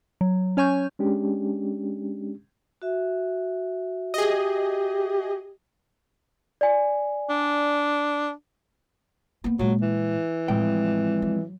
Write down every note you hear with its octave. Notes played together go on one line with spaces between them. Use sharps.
F#3
C#4 C#5 G#5 C#6 G6
G#3 C#4 D4 G4
F#4 E5
G4 G#4 D#5
D5 G#5
D4
A#3 B3
A#2 F#3 G#3
E3
F2 A2 G#3 G5
F#3